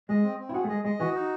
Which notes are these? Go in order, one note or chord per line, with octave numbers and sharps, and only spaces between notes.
G#3 D#5
C4
C4
E4
F#4 G#4
A3
G#3 D#5
G#3 D#5
E3 F#4
D#4